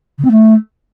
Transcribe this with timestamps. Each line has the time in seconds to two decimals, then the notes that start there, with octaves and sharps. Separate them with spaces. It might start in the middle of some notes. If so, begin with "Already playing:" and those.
0.18 C#3
0.24 C4
0.31 A3